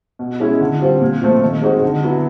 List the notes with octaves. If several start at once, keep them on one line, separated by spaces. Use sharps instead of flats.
B2
G#3 C#4 E4
D3
G3 C4 F4
A#2
F3 A3 C4 F4
D#3
G#3 C4 D#4 F#4
D3
F#3 B3 E4